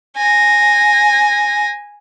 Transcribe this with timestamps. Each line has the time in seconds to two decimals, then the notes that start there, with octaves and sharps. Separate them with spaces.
0.17 G#5 A#6